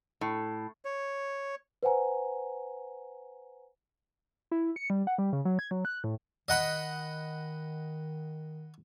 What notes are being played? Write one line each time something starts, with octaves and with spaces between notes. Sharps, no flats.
A2
C#5
B4 C5 F#5 G#5 A#5
E4
C#7
G3
F#5
G3
C#3
F#3
G#6
F#3
F#6
A2
D#3 D#5 F#5 B5